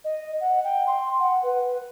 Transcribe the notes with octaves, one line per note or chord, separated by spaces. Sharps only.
D#5
F#5
G5
C6
F#5
B4